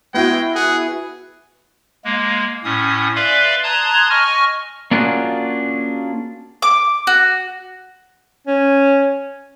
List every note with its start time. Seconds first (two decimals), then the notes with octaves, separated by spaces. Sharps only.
0.14 G#3 B3 E4 F#4 G5
0.55 G#4 F#5
2.04 G#3 A#3
2.64 A2 C#4 D#6
3.16 B4 D5 E5 F5 C6
3.64 A5 A#5 C6 D#6 F#6 G#6
4.10 D#5 G#5 C#6 F6
4.91 A#3 C#4 D4 F4 F#4 G#4
6.62 D6
7.07 F#4
8.47 C#4